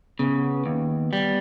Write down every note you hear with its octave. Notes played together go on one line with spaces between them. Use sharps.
C#3 B3
D#2
G3